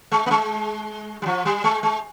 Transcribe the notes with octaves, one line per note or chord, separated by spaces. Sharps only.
G#3
A#3
G#3
G3
F3
G3
G#3
G#3